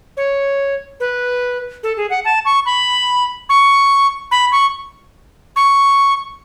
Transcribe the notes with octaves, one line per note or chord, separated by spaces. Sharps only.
C#5
B4
A4
G#4
F#5
A5
C#6
B5
C#6
B5
C#6
C#6